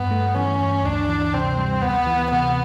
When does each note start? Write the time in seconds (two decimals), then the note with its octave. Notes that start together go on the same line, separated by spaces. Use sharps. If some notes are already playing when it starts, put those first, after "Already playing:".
Already playing: G2 B3
0.11 A3
0.35 E3 C#4
0.61 G2
0.84 D2 D4
1.08 E3
1.33 C3 C4
1.57 G3
1.82 D2 B3
2.07 E3
2.31 C3 B3